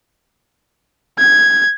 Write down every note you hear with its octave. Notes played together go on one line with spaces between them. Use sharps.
G#6